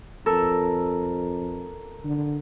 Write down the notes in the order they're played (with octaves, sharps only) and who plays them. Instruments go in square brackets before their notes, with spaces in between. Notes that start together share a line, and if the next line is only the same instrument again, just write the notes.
[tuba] F2 [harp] A4 A#4 E6
[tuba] D3